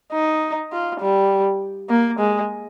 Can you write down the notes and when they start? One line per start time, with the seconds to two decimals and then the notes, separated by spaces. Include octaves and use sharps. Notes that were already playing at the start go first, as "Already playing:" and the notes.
0.12 D#4
0.72 F4
1.01 G3
1.90 A#3
2.19 G#3